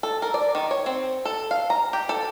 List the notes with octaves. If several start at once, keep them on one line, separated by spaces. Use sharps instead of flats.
A4
A#4
D5
D#3
C#5
C4
A4
F5
A#5
G4
A4